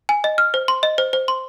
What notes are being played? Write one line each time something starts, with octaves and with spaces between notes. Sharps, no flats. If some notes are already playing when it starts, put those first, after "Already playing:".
G#5
D#5
F6
C5
C6
D#5
C5
C5
C6